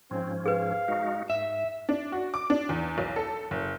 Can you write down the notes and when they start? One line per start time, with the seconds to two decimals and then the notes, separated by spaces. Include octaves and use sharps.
0.11 G#2 F3 C4 C#4
0.46 G#4 B4 F5
0.88 G#3 D#4 F#4
1.30 G#2 E5
1.89 D4
2.12 F#4
2.34 D6
2.50 D4
2.69 E2
2.98 B1
3.16 A4
3.51 F#1